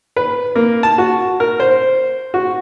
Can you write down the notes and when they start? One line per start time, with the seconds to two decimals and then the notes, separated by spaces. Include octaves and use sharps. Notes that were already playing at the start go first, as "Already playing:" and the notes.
0.16 B4
0.56 A#3
0.83 A5
0.98 F#4
1.40 A#4
1.60 C5
2.34 F#4